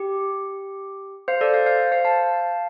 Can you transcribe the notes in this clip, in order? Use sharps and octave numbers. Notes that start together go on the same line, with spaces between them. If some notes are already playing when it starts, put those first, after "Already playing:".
Already playing: G4
C5 F5
A4 D5
C5 F5
C5 F5
C5 F5
F5 A5